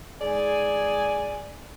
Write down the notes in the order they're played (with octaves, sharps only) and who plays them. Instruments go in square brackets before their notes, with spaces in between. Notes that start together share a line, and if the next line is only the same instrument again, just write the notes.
[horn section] G#2 G#4 D5 G#5